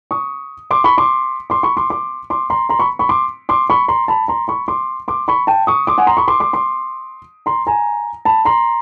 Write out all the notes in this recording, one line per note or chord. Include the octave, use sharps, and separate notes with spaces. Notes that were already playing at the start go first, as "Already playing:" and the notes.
C#6 D#6
C6 D6
B5 C#6
C6 D6
C6 D6
B5 C#6
C6 D6
C6 D6
C6 D6
A#5 C6
A#5 C6
B5 C#6
B5 C#6
C6 D6
C6 D6
B5 C#6
A#5 C6
A5 B5
A#5 C6
B5 C#6
C6 D6
C6 D6
B5 C#6
G5 A5
C#6 D#6
C6 D6
F#5 G#5
A#5 C6
B5 C#6
C6 D6
C6 D6
C6 D6
A#5 C6
G#5 A#5
A5 B5
A#5 C6